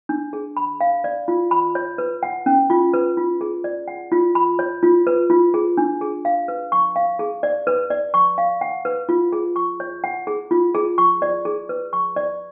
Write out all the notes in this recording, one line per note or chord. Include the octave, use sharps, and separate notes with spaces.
D4
G#4
B5
F5
D5
F4
B5
C#5
B4
F#5
C#4
F4
B4
F4
G#4
D5
F#5
F4
B5
C#5
F4
B4
F4
G#4
D4
G#4
F5
B4
C#6
F5
G#4
D5
B4
D5
C#6
F5
F#5
B4
F4
G#4
C#6
C#5
F#5
G#4
F4
G#4
C#6
D5
G#4
B4
C#6
D5